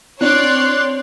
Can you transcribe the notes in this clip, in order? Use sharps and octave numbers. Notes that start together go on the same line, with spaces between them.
C4 D4 C#5 D5 C6 F#6